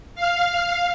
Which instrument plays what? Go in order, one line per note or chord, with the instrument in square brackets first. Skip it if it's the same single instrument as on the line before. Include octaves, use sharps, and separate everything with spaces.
[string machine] F5